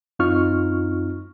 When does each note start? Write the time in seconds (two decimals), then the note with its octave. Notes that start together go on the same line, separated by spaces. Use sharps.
0.19 F#2 C4 D#4 F4 C#6 F6